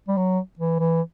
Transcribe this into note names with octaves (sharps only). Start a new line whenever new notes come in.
G3
F#3
E3
E3